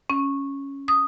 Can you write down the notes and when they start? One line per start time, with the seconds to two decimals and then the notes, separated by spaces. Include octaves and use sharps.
0.10 C#4
0.88 D#6